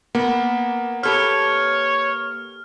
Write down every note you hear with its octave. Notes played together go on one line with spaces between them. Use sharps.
A#3 B3
G4 A4 B4 C#5 F6